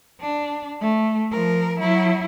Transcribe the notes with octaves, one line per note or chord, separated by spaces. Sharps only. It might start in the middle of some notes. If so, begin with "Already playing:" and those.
D4
A3
F3 A#4
F#3 E4